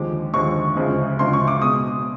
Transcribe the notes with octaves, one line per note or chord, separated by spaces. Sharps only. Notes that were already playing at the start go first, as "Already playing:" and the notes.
Already playing: D#2 D3 F3 G#3 D6
D#2 D3 F3 G#3 C#6
D2 C#3 F3 G#3
D2 C#3 F3 G#3 C6
C#6
D6
B2 G#3 D#6